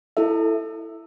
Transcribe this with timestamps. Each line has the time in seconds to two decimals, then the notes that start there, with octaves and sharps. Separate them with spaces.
0.17 E4 A4 E5